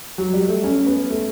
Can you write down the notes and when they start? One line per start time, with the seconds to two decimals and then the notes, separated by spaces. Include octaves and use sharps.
0.18 F#3
0.34 G3
0.48 A3
0.64 C#4
0.86 B3
1.10 A3